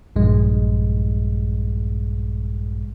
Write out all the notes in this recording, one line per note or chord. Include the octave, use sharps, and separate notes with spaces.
A#1 G2 G#3